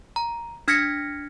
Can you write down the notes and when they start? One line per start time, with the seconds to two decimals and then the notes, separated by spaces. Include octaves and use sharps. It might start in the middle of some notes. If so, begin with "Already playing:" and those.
0.16 A#5
0.68 D4 F6 G#6 A#6 B6 C#7